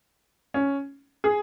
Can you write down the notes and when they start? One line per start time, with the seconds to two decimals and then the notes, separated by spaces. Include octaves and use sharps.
0.54 C#4
1.24 G#4